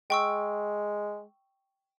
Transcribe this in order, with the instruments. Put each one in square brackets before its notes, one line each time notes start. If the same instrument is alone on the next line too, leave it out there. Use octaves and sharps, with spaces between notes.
[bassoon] G#3 [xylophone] G5 C#6 E6